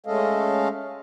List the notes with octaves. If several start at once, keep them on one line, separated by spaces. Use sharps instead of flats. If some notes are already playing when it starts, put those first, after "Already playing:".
G#3 A3 C#4 A4 D#5 F5